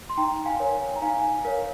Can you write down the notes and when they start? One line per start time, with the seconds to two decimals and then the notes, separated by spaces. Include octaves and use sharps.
0.09 C6
0.17 D#4 G5 A#5
0.46 F5 G#5
0.60 A#4 C#5
0.96 A#5
1.02 D#4 F5 G#5
1.44 A#4 C#5 F5